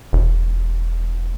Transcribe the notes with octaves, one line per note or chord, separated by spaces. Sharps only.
E1